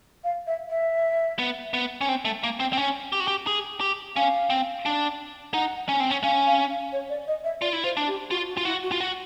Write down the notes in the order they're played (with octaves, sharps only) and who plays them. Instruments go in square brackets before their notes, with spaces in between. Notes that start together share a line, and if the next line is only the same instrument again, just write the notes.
[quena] F5
E5
E5
[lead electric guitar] B3
B3
C#4
C4
A3
A#3
C4
C4
C#4
G4
F#4
G4
G#4
G4
[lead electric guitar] C#4 [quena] F5
[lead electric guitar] C4
D4
[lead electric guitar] D#4 [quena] F#5
[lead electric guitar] C#4
C4
C#4
[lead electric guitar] C#4 [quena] F5
[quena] F5
F5
C#5
D5
D#5
E5
[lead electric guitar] F4 [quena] D5
[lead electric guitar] E4
[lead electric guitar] F4 [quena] C5
[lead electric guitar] D4
[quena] G4
[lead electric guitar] F4 [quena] F#4
[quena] F#4
[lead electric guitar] F4
[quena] E4 [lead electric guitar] F#4
[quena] F#4
[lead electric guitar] F4
F#4